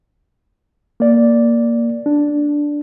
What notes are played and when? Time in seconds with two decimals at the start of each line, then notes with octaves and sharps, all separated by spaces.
1.00 A#3 D5
2.06 D4